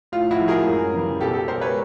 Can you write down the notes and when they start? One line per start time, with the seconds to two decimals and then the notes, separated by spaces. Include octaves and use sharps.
0.12 A2 F4
0.31 E4 F#4
0.40 F3 G#3
0.48 G#4 A#4
0.66 F#2
0.94 C#3 E3 G3
1.21 B2 G4 A4
1.34 G4 A4
1.48 G#3 A#4 C5
1.61 B4 C#5